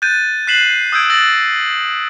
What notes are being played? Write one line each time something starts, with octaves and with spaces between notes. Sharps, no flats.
F#6 G6 A6 D#7
F#6 B6 C7 E7 F#7
D#6 E6 G6 G#6 D7
E6 F#6 A6 A#6 F#7